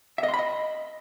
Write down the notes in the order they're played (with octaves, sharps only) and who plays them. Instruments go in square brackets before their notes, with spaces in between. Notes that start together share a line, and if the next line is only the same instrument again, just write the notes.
[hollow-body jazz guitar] E5
D#5
C6
B5
D#5